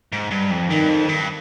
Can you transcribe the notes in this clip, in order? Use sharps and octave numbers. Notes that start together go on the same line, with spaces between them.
G#2
G2
F2
G2 D#3
F2
G2